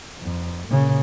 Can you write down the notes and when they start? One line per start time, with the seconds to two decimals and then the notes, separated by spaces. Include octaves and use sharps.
0.21 F2
0.68 A#2 C#3